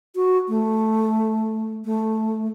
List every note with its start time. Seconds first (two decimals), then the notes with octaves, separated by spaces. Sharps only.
0.16 F#4
0.49 A3
1.85 A3